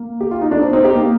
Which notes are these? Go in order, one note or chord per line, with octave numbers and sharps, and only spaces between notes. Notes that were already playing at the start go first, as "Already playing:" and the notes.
Already playing: A#3
G4
F4
D#4
D4
C4
C4 D#4
D#4 G4
A#3